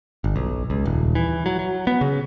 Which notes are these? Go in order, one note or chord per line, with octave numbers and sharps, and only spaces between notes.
G1
B1
C#2
D#1
E3
F#3
F#3
B3
C#3